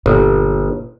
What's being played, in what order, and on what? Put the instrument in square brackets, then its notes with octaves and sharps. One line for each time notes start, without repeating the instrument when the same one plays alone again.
[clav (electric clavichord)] G1 [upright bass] A#2